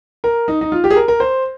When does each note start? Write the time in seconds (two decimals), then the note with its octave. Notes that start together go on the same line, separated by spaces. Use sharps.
0.24 A#4
0.48 D#4
0.61 D#4
0.72 F4
0.84 G4
0.91 G#4
0.96 A#4
1.08 A#4
1.20 C5